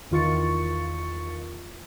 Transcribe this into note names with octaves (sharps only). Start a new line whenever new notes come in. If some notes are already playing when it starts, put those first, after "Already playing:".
E2 D#3 F4 C#6 A6 C#7